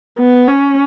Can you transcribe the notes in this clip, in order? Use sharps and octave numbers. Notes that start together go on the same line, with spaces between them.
B3
C#4